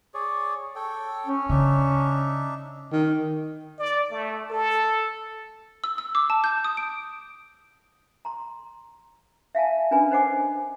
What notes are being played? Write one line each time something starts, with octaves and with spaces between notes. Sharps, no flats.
G#4 C#5 D5
A4 C#5 G5
C#4
C#3 D4 D#4 E5
D#3
D5
A3
A4
E6
E6
D6
A5
G6
D#6
D7
A#5 C6
E5 F5 G#5 A5
C#4 D4 A#4 B4 G#5 B5
B4 C5 D#5 F#5 G#5 D6